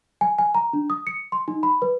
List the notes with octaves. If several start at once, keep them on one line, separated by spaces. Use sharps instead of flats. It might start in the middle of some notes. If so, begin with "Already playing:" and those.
G#5
G#5
A#5
D4
D#6
C#7
C6
D#4
B5
B4